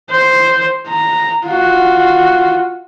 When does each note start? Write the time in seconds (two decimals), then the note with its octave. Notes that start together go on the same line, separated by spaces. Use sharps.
0.11 C5
0.88 A#5
1.46 F4 F#4